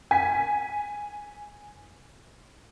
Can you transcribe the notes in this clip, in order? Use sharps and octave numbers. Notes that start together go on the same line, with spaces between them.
G#5 B6